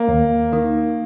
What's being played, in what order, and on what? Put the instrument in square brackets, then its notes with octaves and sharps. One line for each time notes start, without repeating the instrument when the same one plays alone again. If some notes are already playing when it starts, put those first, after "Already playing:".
Already playing: [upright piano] A#3
[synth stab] D#2
D#3